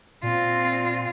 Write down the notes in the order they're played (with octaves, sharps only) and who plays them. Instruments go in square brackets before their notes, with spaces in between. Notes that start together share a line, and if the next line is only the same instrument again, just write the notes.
[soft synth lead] A#2 [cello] C4 F4